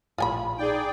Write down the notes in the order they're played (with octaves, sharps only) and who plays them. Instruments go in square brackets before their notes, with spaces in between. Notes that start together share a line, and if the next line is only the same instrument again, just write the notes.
[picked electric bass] A#1 A2 [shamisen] F4 G#5 B5
[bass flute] D#4 [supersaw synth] G#4 D5 G5